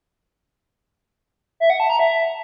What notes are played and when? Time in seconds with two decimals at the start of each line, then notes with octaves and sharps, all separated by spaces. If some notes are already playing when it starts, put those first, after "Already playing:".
1.60 E5
1.70 F#5
1.80 A5
1.90 A#5
1.99 E5